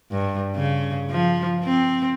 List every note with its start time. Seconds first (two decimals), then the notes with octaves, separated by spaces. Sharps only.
0.12 G2
0.56 C#3
1.11 F3
1.64 C4